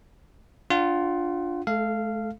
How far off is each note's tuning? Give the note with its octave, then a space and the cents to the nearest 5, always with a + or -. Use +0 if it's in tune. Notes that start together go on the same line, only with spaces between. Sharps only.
D4 +0 F4 +5 F#5 +30
A3 -45 A4 +0 F5 -15